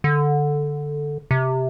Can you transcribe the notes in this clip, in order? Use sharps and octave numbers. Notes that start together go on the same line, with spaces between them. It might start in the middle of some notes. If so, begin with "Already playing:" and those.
D3
C3